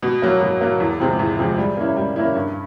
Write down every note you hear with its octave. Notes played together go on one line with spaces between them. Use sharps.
B2
F#3 A#3
B2
F#3 A#3
E2
C3 F3 G#3 C4
E2
C3 F3 G#3 C4
G3
A#3 C#4 E4
G3
A#3 C#4 E4
G2